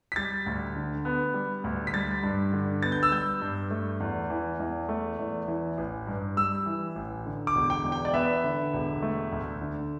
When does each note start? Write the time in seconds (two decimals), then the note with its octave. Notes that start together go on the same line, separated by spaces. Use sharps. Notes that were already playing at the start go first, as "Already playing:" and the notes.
0.12 B6
0.16 G3 A6
0.46 D2
0.76 D3
1.05 B3
1.34 G3
1.64 D2
1.87 B6
1.93 G3 A6
2.23 G2
2.53 D3
2.82 B3 A6
2.92 G6
3.03 E6
3.11 G3 G6
3.42 G2
3.71 A3
4.00 E2
4.30 E3
4.60 E2
4.89 A3
5.19 E2
5.48 E3
5.77 A1
6.07 G2
6.37 G3 E6
6.66 E3
6.95 A1
7.26 D3
7.47 D6
7.55 E1
7.70 G5
7.85 E2
7.92 G5
8.05 D5
8.14 B3 E5
8.44 D3
8.73 E1
9.02 A3
9.32 D2
9.61 D3